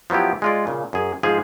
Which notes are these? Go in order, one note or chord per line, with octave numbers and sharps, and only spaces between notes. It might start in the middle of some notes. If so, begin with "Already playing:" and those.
F3 F#3 B3 E4 G4
G#3 F4 D5
A#2 C#3
F#2 G#4
G#2 F3 G#4 F5